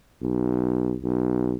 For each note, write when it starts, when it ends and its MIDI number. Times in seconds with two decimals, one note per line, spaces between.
0.22 0.94 35
1.03 1.56 35